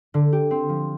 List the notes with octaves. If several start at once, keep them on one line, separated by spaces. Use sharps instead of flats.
D3
G4
C4
F3